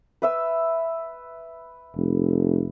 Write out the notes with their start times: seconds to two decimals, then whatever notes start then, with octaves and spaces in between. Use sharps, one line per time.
0.22 B4 E5 E6
1.96 F1